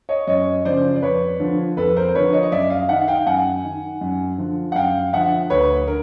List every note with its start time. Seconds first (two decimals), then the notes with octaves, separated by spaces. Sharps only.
0.09 C#5 D#5
0.27 F#2 C#5 D#5
0.65 C#3 F3 C5 D5
0.96 D5
1.02 F2 B4 C#5
1.40 D3 F3
1.77 F2 A4 B4
1.97 A#4 C5
2.15 D3 F3 B4 C#5
2.33 C#5 D#5
2.43 D#5
2.52 F#2 D5 E5
2.70 D#5 F5
2.89 D#3 E5 F#5
3.08 F5 G5
3.26 F#2 F#5 G#5
3.64 D#3
4.01 F#2
4.38 D3 F3
4.72 F#5
4.76 F#2 F5 G5
5.13 D3 F3 E5 F#5
5.50 D2 B4 C#5
5.87 D3 A#4